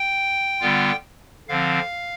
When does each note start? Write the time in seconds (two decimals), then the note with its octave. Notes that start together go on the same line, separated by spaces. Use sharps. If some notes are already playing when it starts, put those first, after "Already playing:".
Already playing: G5
0.61 D3 G3 B3 F4
1.49 D3 F3 C4 F5